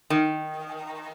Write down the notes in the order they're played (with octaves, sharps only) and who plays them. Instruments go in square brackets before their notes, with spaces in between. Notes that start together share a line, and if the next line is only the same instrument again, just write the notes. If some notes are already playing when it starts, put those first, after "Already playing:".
[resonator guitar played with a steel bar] D#3